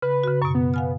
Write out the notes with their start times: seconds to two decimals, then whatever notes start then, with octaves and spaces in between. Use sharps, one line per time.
0.02 C#3 B4
0.24 C#3 F#4
0.42 F#2 B2 C#6
0.55 B3
0.74 F5 G#5 F6